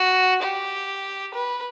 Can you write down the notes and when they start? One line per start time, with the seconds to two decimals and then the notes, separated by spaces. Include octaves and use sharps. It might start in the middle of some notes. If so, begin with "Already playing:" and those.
Already playing: F#4
0.42 G4
1.34 B4